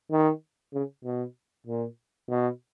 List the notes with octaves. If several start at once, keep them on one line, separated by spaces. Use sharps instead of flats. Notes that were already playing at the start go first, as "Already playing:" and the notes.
D#3
C#3
B2
A#2
B2